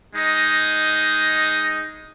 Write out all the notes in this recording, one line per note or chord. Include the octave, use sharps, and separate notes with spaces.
G#3 D#4